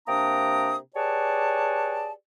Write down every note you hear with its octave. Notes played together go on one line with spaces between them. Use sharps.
C3 A#3 D4 G5 A#5 D#6
G4 G#4 B4 C#5 D5 A5